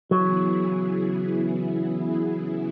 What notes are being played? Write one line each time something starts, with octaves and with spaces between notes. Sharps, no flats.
C#3 E3 F#3 B3 E4 G#4